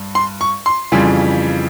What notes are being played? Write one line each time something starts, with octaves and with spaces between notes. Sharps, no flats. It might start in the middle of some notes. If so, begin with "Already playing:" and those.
Already playing: G2
C6
C#6
C6
F2 C#3 E3 G3